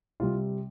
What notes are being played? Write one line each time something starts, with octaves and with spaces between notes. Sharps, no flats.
C3 G3 F4